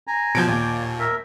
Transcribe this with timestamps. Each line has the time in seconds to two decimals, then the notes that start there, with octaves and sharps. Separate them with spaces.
0.07 G#5 A#5
0.35 B2 F3 G6 G#6 D7
0.48 D#2 A#2 D5
0.99 A#4 E5